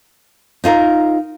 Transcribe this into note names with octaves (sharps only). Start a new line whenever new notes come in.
D#4 F4 G#4 A#4